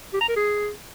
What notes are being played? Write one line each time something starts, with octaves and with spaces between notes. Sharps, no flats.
G4
A#5
A#4
G#4